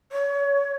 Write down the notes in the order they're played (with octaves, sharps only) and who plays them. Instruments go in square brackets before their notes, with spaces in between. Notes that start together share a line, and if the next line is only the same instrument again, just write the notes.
[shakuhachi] C#5